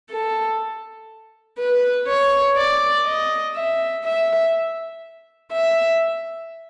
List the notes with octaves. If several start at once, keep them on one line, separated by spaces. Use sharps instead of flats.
A4
B4
C#5
D5
D#5
E5
E5
E5